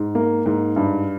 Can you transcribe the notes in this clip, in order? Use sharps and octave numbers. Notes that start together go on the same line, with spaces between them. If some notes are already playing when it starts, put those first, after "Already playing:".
Already playing: G#2
A#3
G#2
G2